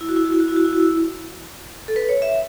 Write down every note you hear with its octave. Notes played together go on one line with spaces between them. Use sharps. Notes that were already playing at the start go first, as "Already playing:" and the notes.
E4
F#4
E4
F#4
E4
F#4
E4
F#4
E4
F#4
E4
A4
B4
C#5
E5